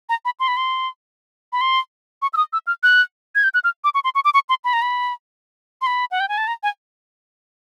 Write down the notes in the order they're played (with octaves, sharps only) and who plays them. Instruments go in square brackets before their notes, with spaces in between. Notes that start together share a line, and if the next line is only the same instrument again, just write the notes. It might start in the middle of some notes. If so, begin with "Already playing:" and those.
[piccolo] A#5
B5
C6
B5
C6
B5
C6
C#6
E6
D#6
E6
F6
F#6
G#6
G6
F#6
F6
D6
C#6
C6
C#6
D6
C#6
C6
B5
A#5
B5
C6
B5
F#5
G5
G#5
A5
A#5
G#5